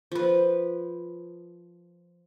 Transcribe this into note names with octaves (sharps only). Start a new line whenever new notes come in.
F3 B4